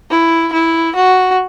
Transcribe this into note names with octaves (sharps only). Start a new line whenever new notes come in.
E4
E4
F#4